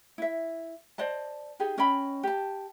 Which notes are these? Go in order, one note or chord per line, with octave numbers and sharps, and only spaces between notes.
E4 E5
C5 D5 D#5 A5
D#4 G4 G#4 D#5
C#4 D#5 G5 B5
G4 A5